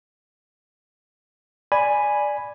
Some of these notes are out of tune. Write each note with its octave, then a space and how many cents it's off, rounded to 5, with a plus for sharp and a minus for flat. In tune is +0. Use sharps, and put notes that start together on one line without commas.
D5 +5 G#5 +0 B5 +0